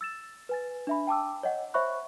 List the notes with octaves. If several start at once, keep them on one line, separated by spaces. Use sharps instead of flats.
E6 A6 E7
B4 G#5 A6
D4 E5 B5
G5 A5 D6 E6
C#5 D#5 F#5
C5 C#5 E5 B5 C#6 F#6